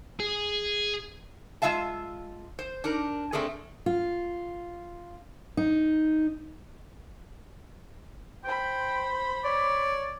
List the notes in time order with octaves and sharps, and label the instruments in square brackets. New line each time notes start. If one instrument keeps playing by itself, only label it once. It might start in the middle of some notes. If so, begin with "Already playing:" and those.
[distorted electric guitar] G#4
[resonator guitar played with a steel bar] G#3 F4 E5 F5 A5
C5
D4 D#4 A#4
A3 C4 D4 G#4 A#4
[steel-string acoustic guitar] F4
D#4
[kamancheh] C5 B5 [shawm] G5
[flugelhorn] C#5 [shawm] D5